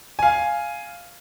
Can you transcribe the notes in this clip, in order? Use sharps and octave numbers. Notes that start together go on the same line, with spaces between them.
F5 G#5